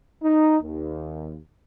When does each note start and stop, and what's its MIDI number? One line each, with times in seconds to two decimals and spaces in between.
0.23 0.56 63
0.61 1.36 39